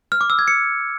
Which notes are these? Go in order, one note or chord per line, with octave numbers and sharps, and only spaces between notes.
F6
D6
E6
G#6
C#7